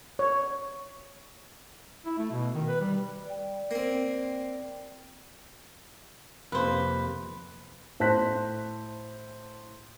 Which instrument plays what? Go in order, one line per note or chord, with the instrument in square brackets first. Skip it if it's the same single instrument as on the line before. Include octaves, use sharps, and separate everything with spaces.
[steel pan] C#5
[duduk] E4
A3
B2
D#3
B4
G3
[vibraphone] D5 G5
[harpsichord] A#3 C4
[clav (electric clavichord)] F2 C3 A#3 [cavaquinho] B4 C5
[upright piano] A2 C5 A5 F#6 B6